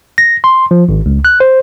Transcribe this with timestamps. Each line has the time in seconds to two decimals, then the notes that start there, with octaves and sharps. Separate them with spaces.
0.18 A#6
0.44 C6
0.71 F3
0.89 G#1
1.06 C#2
1.25 F#6
1.40 C5